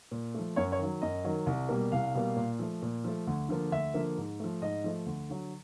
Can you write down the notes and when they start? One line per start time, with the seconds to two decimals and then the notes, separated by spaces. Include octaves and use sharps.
0.11 A#2
0.34 F3 A3
0.56 F#2 C#5
0.72 C#5
0.79 D#3 F#3
1.02 F#2 D#5
1.24 D#3 F#3
1.46 C2
1.69 B2 G3 A#3
1.92 C2 F5
2.14 B2 G3 A#3
2.36 A#2
2.59 F3 A3
2.82 A#2
3.04 F3 A3
3.27 D2
3.49 D3 F3 A#3
3.72 D2 E5
3.94 D3 F3 A#3
4.17 G#2
4.40 F3 A3
4.62 G#2 D#5
4.84 F3 A3
5.06 D2
5.29 D3 F#3